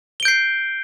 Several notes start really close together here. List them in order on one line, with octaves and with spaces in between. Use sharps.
G7 D7 G6 C7